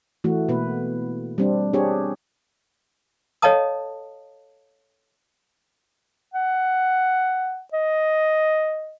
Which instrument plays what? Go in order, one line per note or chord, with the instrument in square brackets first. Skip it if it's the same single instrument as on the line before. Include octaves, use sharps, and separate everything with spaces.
[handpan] E3 A3 F#4
B2 A#3 B3 B4
G3 C4 D4
C4 D4 G4 G#4 C#5
[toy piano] A4 C#5 D#5 F5 A5 D#6
[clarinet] F#5
D#5